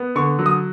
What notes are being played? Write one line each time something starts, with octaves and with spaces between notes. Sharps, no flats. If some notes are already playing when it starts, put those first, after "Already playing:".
Already playing: B3
D3 C#6
F#3
D#6